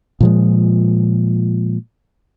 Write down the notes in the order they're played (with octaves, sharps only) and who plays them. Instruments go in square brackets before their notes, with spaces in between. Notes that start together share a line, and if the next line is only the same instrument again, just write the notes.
[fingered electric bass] A#2 F3 G#3